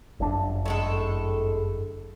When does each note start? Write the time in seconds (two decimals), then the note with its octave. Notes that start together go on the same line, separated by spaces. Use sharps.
0.20 G1 F#2 D4
0.66 A2 G#3 A4